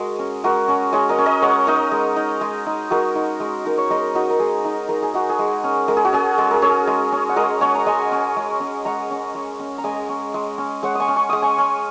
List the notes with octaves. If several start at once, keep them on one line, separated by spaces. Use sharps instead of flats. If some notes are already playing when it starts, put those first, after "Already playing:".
Already playing: G#3 F#4 G#4 A#4
C#4
G#3 F#4 A#4
C#4
G#3 G#4 C#5
A#4 D#5
C#4
A#4 D#5
G#3 C#5 F#5
D#4 A#4 D#5
G#3
D#4
G#3
D#4
G#3 F#4 A#4
D#4
G#3
D#4 A#4
C#5
G#3 A#4 D#5
D#4 F#4 A#4
A#4
G#3 G#4
D#4
G#3 A#4
G#4
D#4 F#4
G#4
G#3
C#4
G#3 A#4
G#4
F#4
C#4 G#4
G#3 G#4
A#4
C#4 G#4 C#5
G#3
C#4
F#5
G#3 A#4 D#5
C#4 C#5 F#5
A#5
G#3 D#5 G#5
C#4
G#3
C#4
G#3 F#5 A#5
C#4
G#3
C#4
A#5
G#3 D#5 G#5
C#4
G#3
C#4
G#3 C#5 F#5
G#5 C#6 D#6
C#4
C#6
G#3 D#6
G#5 C#6
C#4